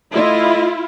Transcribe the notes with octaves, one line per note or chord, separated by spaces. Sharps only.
A3 E4 F4 D#5